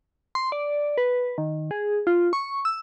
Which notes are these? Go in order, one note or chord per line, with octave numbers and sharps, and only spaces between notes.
C6
D5
B4
D#3
G#4
F4
C#6
E6